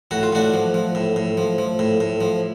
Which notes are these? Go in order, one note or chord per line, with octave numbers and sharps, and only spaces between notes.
A2 F#4
F4
A2 D4 F#4
F3
F3
A2
A2
F3
F3
A2
A2
F3